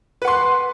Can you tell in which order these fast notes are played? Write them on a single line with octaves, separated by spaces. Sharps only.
B4 F#5 C6